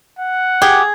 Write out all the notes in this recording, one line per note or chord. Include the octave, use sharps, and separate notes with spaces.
F#5
G4 G#4